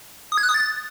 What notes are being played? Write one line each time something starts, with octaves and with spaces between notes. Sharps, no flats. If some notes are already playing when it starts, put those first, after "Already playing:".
D#6
G#6
F#6
D#6
A6